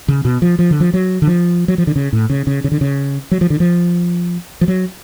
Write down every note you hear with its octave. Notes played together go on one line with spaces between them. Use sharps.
C#3
B2
F3
F3
D3
F3
F#3
D3
F3
F#3
F3
D3
C#3
A2
C#3
C#3
C#3
D3
C#3
F#3
F3
D3
F3
F3
F#3